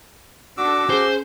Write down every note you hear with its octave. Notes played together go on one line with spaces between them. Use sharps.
D4 F#4 A4 D6 E6
C#4 G#4 C5